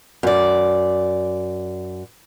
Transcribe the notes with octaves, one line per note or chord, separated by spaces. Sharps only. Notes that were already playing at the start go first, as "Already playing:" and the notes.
F#2 D5